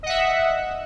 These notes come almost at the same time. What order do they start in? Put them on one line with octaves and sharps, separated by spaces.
D#5 F#5 E5